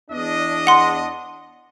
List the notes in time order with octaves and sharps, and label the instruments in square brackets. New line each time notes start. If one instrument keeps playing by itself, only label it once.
[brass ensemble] E2 D4 D#5
[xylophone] F#5 C6